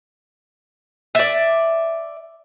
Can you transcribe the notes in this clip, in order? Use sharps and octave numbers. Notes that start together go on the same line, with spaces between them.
D5 E5